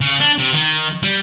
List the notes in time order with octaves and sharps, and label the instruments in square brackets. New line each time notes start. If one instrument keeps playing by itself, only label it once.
[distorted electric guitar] C#3
D4
C3
D#3
G3